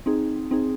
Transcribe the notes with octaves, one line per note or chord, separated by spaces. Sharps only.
C4 D#4 G#4
C4 D#4 G#4